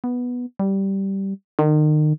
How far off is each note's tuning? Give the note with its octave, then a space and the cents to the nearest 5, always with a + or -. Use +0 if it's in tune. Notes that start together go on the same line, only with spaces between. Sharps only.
B3 -5
G3 -10
D#3 -35